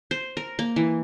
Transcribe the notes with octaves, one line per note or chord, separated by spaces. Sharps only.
C5
A#4
A#3
E3